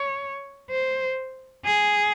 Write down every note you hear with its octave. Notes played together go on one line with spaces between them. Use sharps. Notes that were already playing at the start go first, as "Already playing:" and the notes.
Already playing: C#5
C5
G#4